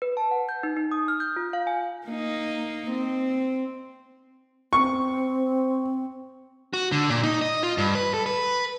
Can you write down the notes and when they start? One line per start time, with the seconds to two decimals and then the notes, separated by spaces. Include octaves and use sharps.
0.02 B4
0.17 A5
0.31 F#5
0.49 G6
0.63 D#4
0.77 D#4
0.92 D#6
1.08 F6
1.20 G6
1.36 F4
1.53 F5
1.67 G#5
2.07 A#3 D#4
2.91 C4
4.73 C4 C#6
6.73 F#4
6.92 D3
7.10 A#2
7.24 D#4
7.42 D#5
7.63 F4
7.78 G2
7.95 B4
8.14 A4
8.26 B4